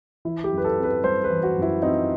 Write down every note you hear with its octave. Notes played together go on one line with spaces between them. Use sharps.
E3 E4
G4
F#2
B4
A4
C4
B4
G3 C5
B4
E3
F#4
F#2
E4
C4 D#4